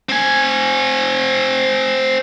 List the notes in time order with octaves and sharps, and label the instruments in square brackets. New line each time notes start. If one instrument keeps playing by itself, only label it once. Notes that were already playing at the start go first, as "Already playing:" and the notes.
[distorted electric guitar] C4 G#5